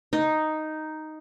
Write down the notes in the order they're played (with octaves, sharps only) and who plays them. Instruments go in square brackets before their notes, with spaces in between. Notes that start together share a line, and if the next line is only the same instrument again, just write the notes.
[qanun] D#4